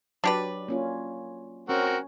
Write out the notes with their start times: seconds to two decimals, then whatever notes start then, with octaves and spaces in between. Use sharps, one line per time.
0.24 F#3 D4 G4 B4 D5
0.68 A#3 C#4 F4
1.69 C4 C#4 F#4 A#4